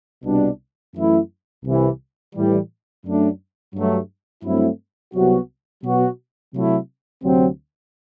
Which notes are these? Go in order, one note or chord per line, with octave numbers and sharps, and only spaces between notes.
C2 B2 G3 D4
F#2 E3 A3 E4
C2 C3 E3
A2 E3 G3
F#2 F#3 A3 D4
G2 F#3 A3
G2 F#3 A3 C4 E4
C2 C3 F#3 B3 F#4
B2 F#3 B3 F#4
C3 F#3 A3 E4
D2 C3 F#3 C4